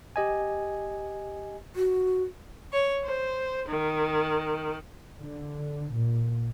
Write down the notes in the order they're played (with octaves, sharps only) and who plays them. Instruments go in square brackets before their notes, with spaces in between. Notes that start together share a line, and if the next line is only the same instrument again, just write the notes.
[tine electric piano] G4 D#5 G#5
[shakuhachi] F#4
[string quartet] C#5
C5
D#3
[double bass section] D3
A#2